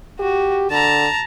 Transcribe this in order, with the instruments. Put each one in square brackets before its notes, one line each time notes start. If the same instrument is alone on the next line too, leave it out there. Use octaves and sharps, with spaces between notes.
[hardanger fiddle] F#4 [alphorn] G4
[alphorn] D3 [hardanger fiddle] A5 A#5